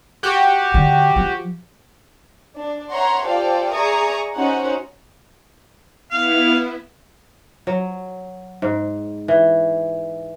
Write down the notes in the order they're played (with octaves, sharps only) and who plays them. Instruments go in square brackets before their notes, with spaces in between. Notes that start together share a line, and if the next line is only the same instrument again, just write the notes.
[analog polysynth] F#4 G4
[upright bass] D3
F3
[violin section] D4
C#5 E5 F#5 A#5 C6
F4 G4 A4 C5 D5 F5
G#4 D5 E5 A#5 C#6 D#6
C#4 D#4 F#4 C5 F#5
[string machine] B3 E4 [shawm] F5
[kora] F#3
G#2
E3